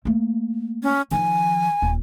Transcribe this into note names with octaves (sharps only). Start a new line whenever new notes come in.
A3 A#3
C#4
D#3 F3 G#5
D#1